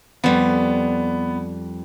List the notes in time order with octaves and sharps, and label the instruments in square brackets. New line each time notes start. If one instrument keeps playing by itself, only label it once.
[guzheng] F2 G3 [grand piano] B3